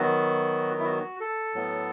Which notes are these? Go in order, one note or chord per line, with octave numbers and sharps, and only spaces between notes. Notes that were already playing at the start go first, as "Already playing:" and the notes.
Already playing: D#3 F#3 B3 F#4
E4
F#4
A4
A2 F#3 B3